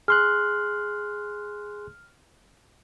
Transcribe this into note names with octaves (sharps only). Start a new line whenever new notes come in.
G#4 C6 F6 F#6